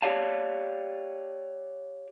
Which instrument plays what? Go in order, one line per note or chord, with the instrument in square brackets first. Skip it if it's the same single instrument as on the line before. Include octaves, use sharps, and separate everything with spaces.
[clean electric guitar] G4 C#5 D5 F5 A5